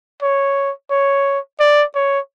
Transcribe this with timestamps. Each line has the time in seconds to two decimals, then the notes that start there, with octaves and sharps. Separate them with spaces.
0.23 C#5
0.91 C#5
1.60 D5
1.95 C#5